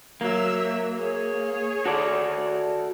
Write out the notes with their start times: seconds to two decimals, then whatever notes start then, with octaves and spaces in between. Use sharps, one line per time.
0.21 F#3 A#3 E5
0.98 G#4 C#5
1.86 F#4 A4 D5